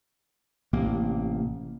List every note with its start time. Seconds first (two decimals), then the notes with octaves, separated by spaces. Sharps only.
0.73 A1 C3 A#3